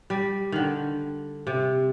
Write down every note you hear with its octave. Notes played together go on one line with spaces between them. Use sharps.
G3
D3 D#3
C3